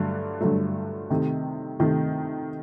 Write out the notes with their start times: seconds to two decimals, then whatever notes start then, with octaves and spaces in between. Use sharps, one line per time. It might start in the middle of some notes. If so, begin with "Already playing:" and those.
Already playing: G2 D3 F#3 A3
0.41 G2 D3 F#3 A3
1.10 C3 D#3 A3
1.80 C3 D#3 A3